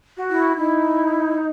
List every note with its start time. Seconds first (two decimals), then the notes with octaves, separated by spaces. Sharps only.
0.17 F#4
0.30 E4
0.56 D#4 E4